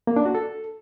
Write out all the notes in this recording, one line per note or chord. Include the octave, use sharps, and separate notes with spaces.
A#3
D4
F#4
A4